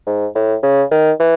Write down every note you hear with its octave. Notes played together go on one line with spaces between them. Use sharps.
G#2
A2
C#3
D#3
E3